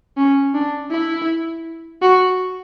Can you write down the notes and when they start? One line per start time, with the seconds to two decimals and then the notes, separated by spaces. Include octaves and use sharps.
0.17 C#4
0.54 D4
0.92 E4
2.02 F#4